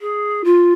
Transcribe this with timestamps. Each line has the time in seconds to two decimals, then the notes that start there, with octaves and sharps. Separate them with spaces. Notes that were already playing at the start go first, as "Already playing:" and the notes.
0.01 G#4
0.44 F4